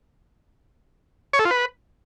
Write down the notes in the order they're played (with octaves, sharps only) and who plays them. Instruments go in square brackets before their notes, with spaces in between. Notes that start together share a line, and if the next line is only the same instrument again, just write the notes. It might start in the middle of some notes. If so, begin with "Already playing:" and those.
[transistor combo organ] C#5
A4
F4
B4